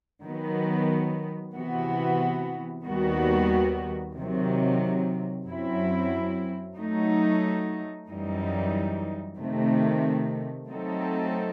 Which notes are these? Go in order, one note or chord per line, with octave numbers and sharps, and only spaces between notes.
D#3 F#3 B3
C3 E3 B3 F#4
D#2 D#3 G3 B3 F#4
C3 D#3 F#3
F#2 F#3 C4 E4
F#3 A3 D#4
F#2 E3 G3 D#4
C3 D#3 A3
F#3 A3 C4 D#4 A4